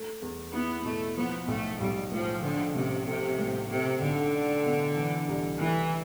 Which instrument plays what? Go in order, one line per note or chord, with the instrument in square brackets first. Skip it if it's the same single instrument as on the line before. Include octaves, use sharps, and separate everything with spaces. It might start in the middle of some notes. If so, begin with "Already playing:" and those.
Already playing: [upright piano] A3
E2
[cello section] B3 [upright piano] E4
[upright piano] B2 [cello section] A3
[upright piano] F3 [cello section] B3
[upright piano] B1 [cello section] A3
[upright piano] B1 [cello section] G3
[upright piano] A2 [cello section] F3
[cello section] D3 [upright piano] F3
[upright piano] A1 [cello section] C3
[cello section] C3 [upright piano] A3
[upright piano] A2
[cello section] C3 [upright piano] A3
[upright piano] B1 [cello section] D3
[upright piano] D4
B2
E3
C2
[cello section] E3 [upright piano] A3